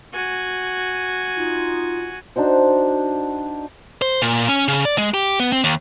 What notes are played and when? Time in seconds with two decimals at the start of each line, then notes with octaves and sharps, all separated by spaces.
0.14 F#4 G#5
1.36 D#4 F4
2.36 D4 D#4 F#4 C5
4.02 C5
4.22 A#2
4.48 C#4
4.68 C#3
4.85 D5
4.98 G#3
5.14 G4
5.40 B3
5.52 C4
5.64 D#2